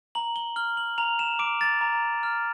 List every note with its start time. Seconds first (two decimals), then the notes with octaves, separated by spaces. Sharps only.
0.15 A#5 F#7
0.36 G7
0.56 F6 G7
0.77 F#7
0.98 A#5 F7
1.19 E7
1.39 D6 D7
1.61 A6
1.81 A#5
2.23 F6